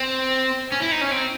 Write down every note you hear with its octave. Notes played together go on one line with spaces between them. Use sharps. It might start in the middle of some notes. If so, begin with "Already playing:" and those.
Already playing: C4
C#4
E4
D#4
C#4
C4